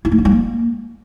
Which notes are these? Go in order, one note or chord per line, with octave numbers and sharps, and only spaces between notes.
E4
A3
D4
G3
A#3